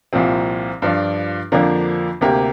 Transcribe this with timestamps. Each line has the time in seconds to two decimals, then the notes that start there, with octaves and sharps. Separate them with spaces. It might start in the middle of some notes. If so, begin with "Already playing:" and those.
0.13 C2 A#2 F3 C4
0.82 G2 F3 D4 F4
1.52 F2 D3 F3 A#3 D4
2.21 D2 C3 A#3 G4